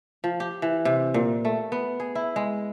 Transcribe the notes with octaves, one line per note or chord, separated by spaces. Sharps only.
F3
G4
E3
C3
A#2
A3
B3
G#4
E4
G#3